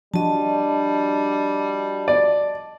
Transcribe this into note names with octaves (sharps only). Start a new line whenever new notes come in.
F3 G3 D4 F#4 D#5 A5
D5